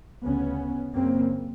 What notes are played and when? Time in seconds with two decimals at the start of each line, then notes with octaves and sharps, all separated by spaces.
0.24 D2 C#3 B3 C#4
0.94 F#2 C#3 A#3 C4